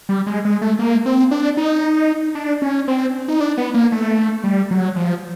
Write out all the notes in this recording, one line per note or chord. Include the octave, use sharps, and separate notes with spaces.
G3
G#3
G#3
A3
A#3
C4
D4
D#4
D4
C#4
C4
D#4
D4
B3
A#3
A3
G3
F#3
F3